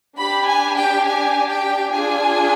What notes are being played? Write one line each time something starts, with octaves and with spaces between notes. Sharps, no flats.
D4 G4 B5
G#5
G5
G#5
G5
D4 F4 G#4 G#5